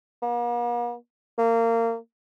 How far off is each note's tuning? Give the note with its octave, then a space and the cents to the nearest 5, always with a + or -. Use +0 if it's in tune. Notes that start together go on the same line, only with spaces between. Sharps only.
A#3 +45
A#3 -25